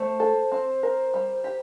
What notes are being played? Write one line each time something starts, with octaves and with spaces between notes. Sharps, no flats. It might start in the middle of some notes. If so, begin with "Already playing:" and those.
Already playing: A3 C5
A4
C4
A#4
G3
G4